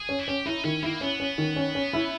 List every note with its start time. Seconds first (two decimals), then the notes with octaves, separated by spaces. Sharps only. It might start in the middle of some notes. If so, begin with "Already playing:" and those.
Already playing: G#4
0.09 C#4
0.19 E4
0.28 C#4 G4
0.46 D#4 E4
0.64 D#3 C#4
0.82 A#3 E4
1.01 B3 C#4
1.20 C#4
1.38 D#3
1.56 C#4
1.75 C#4
1.93 E4